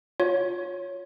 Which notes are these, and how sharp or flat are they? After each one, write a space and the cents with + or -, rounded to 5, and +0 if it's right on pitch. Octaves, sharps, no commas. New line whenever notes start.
F4 +20 C#5 +0